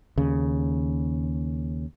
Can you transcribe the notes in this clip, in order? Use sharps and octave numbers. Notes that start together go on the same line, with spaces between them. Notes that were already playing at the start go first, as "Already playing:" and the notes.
D#2 C#3